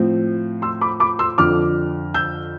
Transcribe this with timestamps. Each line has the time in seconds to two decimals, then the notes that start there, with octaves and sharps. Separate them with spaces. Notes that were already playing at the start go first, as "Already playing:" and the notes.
Already playing: A2 F3 C4
0.62 C6 E6
0.81 B5 D6
1.00 B5 D6
1.19 C6 E6
1.38 F2 D3 F3 D6 F6
2.14 E6 G6